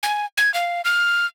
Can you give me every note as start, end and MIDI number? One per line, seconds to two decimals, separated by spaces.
0.03 0.25 80
0.38 0.53 92
0.54 0.82 77
0.85 1.26 89